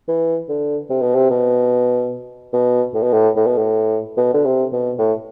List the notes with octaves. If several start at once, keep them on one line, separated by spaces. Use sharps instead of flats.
E3
D3
C3
B2
C3
B2
B2
A2
B2
A2
A2
B2
A2
B2
D3
C3
B2
A2